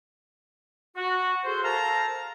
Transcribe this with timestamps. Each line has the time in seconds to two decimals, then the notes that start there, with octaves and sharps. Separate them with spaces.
0.96 F#4
1.43 F#4 G#4 A4 C5
1.63 A4 A#4 C5 F5 A5 A#5